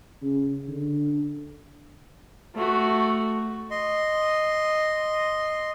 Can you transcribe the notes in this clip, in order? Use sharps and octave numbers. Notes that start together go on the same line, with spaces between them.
C#3
D3
A3 F#4
D#5 C6